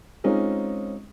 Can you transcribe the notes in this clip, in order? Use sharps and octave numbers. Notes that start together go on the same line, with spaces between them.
G#3 C4 C#4 D#4 F4 G#4